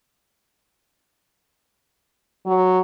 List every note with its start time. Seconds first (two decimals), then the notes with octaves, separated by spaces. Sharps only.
2.46 F#3